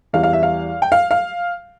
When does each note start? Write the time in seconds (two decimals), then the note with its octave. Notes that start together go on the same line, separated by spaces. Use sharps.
0.13 E2 E3 G3 F5
0.23 F5
0.33 E5
0.43 F5
0.82 G5
0.92 F5
1.11 F5